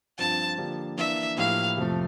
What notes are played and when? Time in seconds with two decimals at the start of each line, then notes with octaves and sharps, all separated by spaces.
0.18 G2 F3 C4 F4 A5
0.58 D3 F3 A#3 D4 G4
0.98 E3 A#3 D4 E5
1.37 A2 F3 A#3 E4 G4 F5
1.78 F2 C3 F3 A3